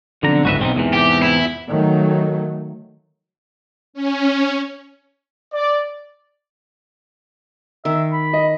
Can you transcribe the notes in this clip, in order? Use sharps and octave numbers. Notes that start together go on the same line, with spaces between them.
B1 F2 D3 A#5
G1 C#2 G#2 F#4 B4 E5
B1 C4 D4 D#4
E2 G#2 C3 E3
G4
E4
D#3 F#3 A3
C#4
D5
D#3 E5
B5
D#5